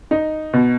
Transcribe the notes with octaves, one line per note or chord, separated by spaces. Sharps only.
D#4
B2